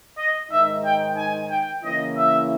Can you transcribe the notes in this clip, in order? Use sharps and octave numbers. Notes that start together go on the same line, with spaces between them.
D#5
G#2 D#3 G#3 D#4 E5
G5
G#5
G5
C#3 E3 A#3 C#4 E4 D#5
E5